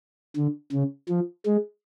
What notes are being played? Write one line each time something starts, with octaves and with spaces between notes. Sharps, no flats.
D3
C#3
F3
G#3